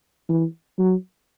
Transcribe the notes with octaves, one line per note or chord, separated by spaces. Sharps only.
E3
F#3